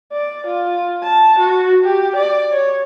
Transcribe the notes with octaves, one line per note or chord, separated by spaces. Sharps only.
D5
F4
A5
F#4
G4
D5
C#5